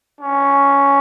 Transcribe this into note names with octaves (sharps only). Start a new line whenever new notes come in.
C#4